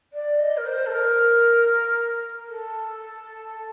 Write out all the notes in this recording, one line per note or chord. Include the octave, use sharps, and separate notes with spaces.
D5
D#5
A#4
C5
A4
A#4
A4